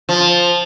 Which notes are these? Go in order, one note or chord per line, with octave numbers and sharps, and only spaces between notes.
F3